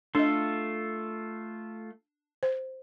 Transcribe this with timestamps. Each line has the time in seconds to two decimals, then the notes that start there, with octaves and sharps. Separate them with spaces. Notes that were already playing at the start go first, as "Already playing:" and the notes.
0.15 A3 D4 F4 A4 D#5
2.43 C5